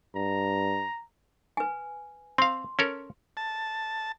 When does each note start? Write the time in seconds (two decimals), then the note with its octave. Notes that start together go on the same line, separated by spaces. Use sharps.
0.15 G2 A#5
1.57 B4 G#5
2.38 C4 F5 C6
2.79 C#4 A4 A#4
3.37 A5